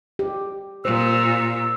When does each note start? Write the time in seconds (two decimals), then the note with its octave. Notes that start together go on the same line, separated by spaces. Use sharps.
0.19 G4
0.85 A#2 C5 E6